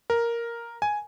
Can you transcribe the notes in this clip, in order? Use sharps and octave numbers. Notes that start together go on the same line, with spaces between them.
A#4
G#5